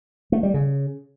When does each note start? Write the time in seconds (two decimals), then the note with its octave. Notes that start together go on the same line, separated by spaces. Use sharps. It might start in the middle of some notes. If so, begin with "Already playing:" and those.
0.32 A3
0.43 G3
0.54 C#3